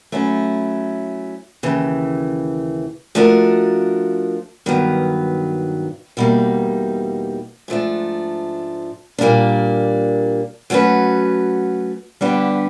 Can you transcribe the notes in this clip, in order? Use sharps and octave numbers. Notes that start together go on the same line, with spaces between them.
F#3 A3 C#4 E4
D#2 C#3 E3
F3 A3 D4 F#4 A#4
G2 D#3 F#3 B3
E2 B2 G3 A#3 D#4
G#2 F3 A3 D4
A#2 G3 A#3 D4
F#3 A3 C#4 F#4 B4
D3 G3 B3 D4 G4